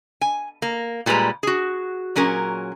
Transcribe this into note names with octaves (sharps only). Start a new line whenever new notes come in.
G#5
A#3
A#2 G3 G#3 B4 A#5
F#4 G#4
A#2 F#3 C#4 G#4 A#4